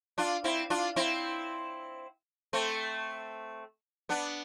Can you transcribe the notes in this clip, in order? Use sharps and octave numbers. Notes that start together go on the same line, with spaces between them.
D4 F4
C4 E4
D4 F4
C4 E4
A3 C4
B3 D4